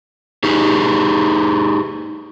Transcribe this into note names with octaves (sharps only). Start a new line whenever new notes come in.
D#4 G4 G#4